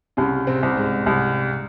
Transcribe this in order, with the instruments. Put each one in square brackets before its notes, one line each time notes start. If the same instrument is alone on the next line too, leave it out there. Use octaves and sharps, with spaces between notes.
[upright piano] C2 [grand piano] C#3 C#4
[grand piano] C3 C4
[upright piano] C2
[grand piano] G#2 G#3
[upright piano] C2